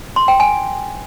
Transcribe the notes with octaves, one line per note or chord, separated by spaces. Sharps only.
C6
G5
G#5